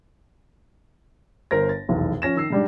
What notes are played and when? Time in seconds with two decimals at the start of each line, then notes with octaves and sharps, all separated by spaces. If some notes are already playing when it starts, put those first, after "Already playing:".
1.51 G1 A#4 C5 A#6
1.69 A6
1.89 F1 B1 E2
2.22 F3 C#4 A#6 E7
2.36 D#3 E6 C7
2.50 G#2 G3 D4